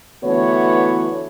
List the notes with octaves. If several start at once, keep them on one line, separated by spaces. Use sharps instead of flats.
D3 E3 A3 B3 F#4 C#5